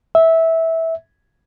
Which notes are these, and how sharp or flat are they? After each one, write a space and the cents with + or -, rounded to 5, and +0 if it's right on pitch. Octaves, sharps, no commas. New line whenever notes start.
E5 -15